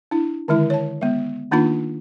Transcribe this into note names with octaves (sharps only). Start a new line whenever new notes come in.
D4 E4
D3 D#3 G#3 E4
C#5 A5
G#3 B3
D#3 A#3 D4 D#4 F4 B5